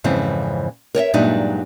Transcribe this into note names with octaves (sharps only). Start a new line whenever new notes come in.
F2 G#2 C#3 E3 C4
A#4 C#5 D#5 E5
G2 A#2 F#3 G#3 D4 D#4